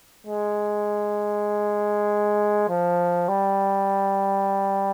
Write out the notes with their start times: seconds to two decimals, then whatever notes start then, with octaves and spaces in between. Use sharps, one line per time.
0.27 G#3
2.69 F3
3.29 G3